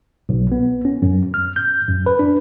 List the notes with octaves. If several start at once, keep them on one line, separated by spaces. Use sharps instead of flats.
B1
B3
C#4
F#2
F6
G6
F#2
B4
D4